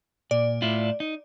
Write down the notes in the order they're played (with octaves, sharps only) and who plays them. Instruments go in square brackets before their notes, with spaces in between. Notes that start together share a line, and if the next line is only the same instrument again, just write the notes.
[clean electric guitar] A#2 [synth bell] D5
[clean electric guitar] A2 E4 F4
D#4